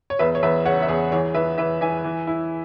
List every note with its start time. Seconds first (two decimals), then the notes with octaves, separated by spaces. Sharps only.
0.10 C#5
0.19 E2 B4 E5
0.35 C#5
0.42 E2 B4 E5
0.65 C#3 C#5 F#5
0.82 E5
0.88 E2 G#4 C#5
1.12 E3 G#4 C#5
1.34 E3 B4 E5
1.58 E3 B4 E5
1.81 E3 E5 G#5
2.04 E3
2.27 E4